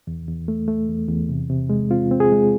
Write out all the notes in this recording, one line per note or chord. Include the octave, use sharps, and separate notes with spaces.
E2
E2
A3
A3
E2
E2
C3
C3
G#3
C4 F4
C4
G#4
G#3